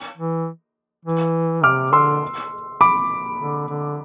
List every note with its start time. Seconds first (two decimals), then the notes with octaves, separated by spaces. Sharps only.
0.17 E3
1.05 E3
1.63 C3 D6 F6
1.93 D3 C6 E6
2.81 B5 D6
3.40 D3
3.69 D3